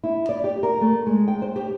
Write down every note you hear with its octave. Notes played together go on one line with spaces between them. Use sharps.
E4
D5
G4
A#4
A3
G#3
G5
C5
G4